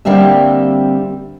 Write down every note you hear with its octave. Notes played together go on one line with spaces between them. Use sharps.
D3 G3 A#3 C4 G4 E5